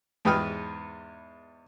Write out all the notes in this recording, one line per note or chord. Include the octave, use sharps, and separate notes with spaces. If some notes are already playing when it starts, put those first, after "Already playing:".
E2 G#2 B4 G5 D#6 F6